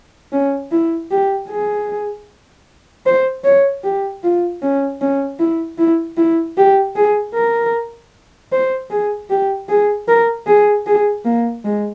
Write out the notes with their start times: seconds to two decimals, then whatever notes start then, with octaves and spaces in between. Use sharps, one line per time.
0.32 C#4
0.71 E4
1.11 G4
1.49 G#4
3.06 C5
3.44 C#5
3.84 G4
4.23 F4
4.62 C#4
5.01 C#4
5.39 E4
5.78 E4
6.17 E4
6.57 G4
6.95 G#4
7.34 A#4
8.52 C5
8.90 G#4
9.30 G4
9.69 G#4
10.08 A#4
10.47 G#4
10.87 G#4
11.25 A#3
11.64 G#3